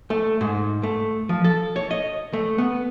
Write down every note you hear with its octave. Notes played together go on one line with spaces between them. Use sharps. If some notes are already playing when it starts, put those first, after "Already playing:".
A3
G#2
A3
F3
A4
C#5
D#5
A3
B3